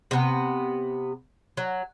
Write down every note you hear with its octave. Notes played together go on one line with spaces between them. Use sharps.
C3 B3
F#3